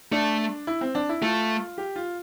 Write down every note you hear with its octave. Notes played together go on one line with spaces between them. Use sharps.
A3 D4
E4
C4
D4
E4
A3 F4
G4
F4